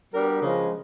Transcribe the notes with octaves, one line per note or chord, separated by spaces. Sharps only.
G3 B3 D4 F#4 A#4
C#3 F3 G#3